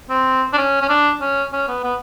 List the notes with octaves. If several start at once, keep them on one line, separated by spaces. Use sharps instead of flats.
C4
D4
C#4
C#4
D4
C#4
C#4
B3
B3